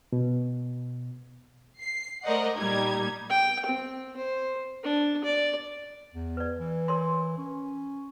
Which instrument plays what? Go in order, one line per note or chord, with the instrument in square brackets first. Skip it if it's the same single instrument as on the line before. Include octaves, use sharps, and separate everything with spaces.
[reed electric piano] B2
[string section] C7
A3 A#4 C5 D5 D#5 F#5
A#2 G3 D#4 G4 G#6
[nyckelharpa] G5
C4
C5
D4
D5
[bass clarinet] E2
[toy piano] B4 D5
[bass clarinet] E3
[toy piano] A#4 C#5 C6
[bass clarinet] C#4